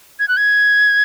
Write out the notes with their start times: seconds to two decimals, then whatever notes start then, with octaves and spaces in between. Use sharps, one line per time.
0.19 G#6
0.28 F#6
0.37 G#6